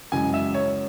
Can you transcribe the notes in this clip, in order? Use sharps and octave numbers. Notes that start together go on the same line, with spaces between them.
F#2 C#3 E3 G#3 G#5
E5
C#5